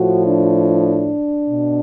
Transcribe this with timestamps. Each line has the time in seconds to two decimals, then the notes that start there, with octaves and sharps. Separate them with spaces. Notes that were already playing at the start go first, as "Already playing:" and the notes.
Already playing: A2 F3 F#4
0.26 D4
1.48 B2